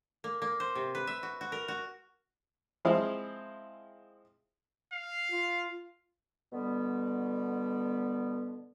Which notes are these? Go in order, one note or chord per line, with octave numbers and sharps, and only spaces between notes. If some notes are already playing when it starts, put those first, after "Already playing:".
A#3
A#3
C5
C3
B4
E5
F#4
F#4
A#4
F#4
F3 G#3 C4 E4 G#4 F5
F5
F4
B2 D3 G3 B3